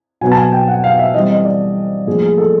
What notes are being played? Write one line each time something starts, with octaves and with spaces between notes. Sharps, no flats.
B2 F#3 B3 G#5
A5
G#5
G5
F#5
F5
E5
E3 G3 C4 D#5
D#5
D5
A2 F3 A#3 G#4
G#4
A4